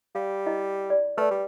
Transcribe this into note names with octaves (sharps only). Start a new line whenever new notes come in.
G3 F5
E4 D#5
D5
A3 B4 D5
G3